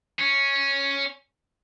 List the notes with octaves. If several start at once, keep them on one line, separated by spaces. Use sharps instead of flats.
C#4